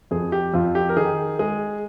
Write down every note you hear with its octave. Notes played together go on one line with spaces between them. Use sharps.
F2 G#4
G4
F2 F4
G4
A#4
D#3 G#4
G#3 G#4